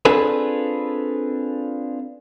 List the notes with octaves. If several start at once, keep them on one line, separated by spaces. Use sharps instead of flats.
C4 D4 F4 G#4 A4 B4